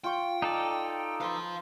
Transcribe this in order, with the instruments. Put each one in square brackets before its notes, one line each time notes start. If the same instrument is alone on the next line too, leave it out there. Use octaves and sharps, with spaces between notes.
[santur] F4 C#6 [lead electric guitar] G5
[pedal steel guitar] D#4 A4 D5
[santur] B4 C6 [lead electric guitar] C5 F5